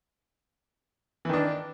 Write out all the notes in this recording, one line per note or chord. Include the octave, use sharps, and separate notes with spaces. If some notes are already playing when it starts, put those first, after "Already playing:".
D#3 E3 D4